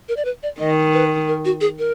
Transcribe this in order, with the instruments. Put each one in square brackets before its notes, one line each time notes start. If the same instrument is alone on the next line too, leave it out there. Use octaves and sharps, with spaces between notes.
[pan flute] A#4
D5
B4
D5
[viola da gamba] D#3 [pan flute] D#5
[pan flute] B4
A#4
F#4
G#4
A#4